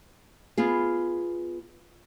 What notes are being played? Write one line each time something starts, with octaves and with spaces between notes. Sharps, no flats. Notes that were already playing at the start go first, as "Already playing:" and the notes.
B3 F4 G#4